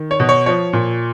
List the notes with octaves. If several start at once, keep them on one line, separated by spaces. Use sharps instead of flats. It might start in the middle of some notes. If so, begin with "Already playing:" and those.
Already playing: D#3
C#5
B2
C#5
F3 C#5
A#2